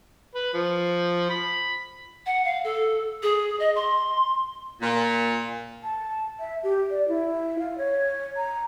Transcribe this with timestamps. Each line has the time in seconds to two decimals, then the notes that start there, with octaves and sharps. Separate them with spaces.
0.35 B4
0.54 F3
1.30 B5
2.26 F#5
2.45 F5
2.64 A4
3.23 G#4
3.59 D#5
3.76 C6
4.81 A#2
5.83 A5
6.40 E5
6.63 G4
6.91 D5
7.08 E4
7.59 F5
7.78 C#5
8.37 A#5